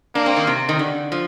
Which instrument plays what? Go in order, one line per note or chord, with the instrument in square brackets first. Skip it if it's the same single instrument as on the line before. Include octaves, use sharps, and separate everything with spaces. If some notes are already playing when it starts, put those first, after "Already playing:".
[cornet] A#3 [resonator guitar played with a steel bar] D4
[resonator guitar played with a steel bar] C4
D#3
C3
D#3
D3
F3